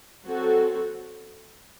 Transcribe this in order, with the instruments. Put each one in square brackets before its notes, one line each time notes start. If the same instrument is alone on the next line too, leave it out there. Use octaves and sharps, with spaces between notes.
[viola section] F#3 C4 F#4 A4